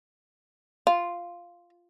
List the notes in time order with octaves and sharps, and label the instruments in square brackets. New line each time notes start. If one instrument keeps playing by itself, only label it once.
[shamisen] F4